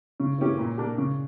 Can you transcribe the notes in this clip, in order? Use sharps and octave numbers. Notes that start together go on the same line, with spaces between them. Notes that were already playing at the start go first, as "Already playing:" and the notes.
C#3
E3 A#3 C#4 G4
A#2
A#3 D4 G4
C#3